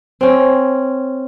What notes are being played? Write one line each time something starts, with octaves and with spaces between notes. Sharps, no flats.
C4 C#4